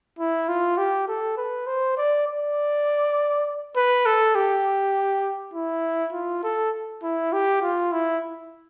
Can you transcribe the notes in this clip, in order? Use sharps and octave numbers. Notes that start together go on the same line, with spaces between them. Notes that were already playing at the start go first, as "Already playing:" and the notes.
E4
F4
G4
A4
B4
C5
D5
D5
B4
A4
G4
E4
F4
A4
E4
G4
F4
E4